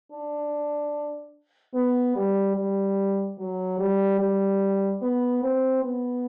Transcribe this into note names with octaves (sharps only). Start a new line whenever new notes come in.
D4
B3
G3
G3
F#3
G3
G3
B3
C4
B3